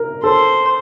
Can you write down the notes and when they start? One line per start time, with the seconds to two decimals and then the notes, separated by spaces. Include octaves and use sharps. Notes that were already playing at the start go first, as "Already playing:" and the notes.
Already playing: A#4
0.24 A4 C5